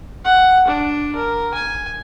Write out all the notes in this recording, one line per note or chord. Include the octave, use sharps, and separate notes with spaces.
F#5
D4
A#4
G#5